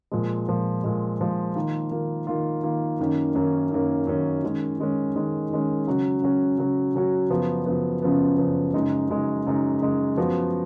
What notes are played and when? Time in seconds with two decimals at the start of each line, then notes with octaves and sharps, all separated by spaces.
0.12 A#2 F3 G#3
0.48 A#2 F3 G#3
0.84 A#2 F3 G#3
1.20 A#2 F3 G#3
1.55 D#3 A#3 F4
1.91 D#3 A#3 F4
2.27 D#3 A#3 F4
2.63 D#3 A#3 F4
2.99 F#2 D#3 A#3 C#4
3.35 F#2 D#3 A#3 C#4
3.71 F#2 D#3 A#3 C#4
4.07 F#2 D#3 A#3 C#4
4.43 D#3 G#3 C#4
4.78 D#3 G#3 C#4
5.15 D#3 G#3 C#4
5.50 D#3 G#3 C#4
5.87 C#3 F#3 C#4 F#4
6.22 C#3 F#3 C#4 F#4
6.58 C#3 F#3 C#4 F#4
6.95 C#3 F#3 C#4 F#4
7.30 F#2 C#3 F3 B3
7.66 F#2 C#3 F3 B3
8.02 F#2 C#3 F3 B3
8.38 F#2 C#3 F3 B3
8.74 F#2 C#3 G#3 D#4
9.09 F#2 C#3 G#3 D#4
9.47 F#2 C#3 G#3 D#4
9.82 F#2 C#3 G#3 D#4
10.17 F#2 F3 B3 F#4